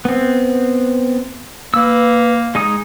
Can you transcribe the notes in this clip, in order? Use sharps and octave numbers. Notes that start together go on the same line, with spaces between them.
B3 C4
A#3 B4 E6
G#3 D#4 D#6